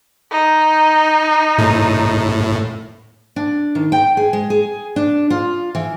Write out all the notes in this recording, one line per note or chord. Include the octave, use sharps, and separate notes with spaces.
D#4
A2
D4
D#3
G5
G#4
G#3
G#4
D4
F4
E3